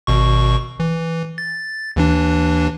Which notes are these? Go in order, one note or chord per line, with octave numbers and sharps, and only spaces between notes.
G#1 B2 C#6
E3
A6
D#2 E3 D4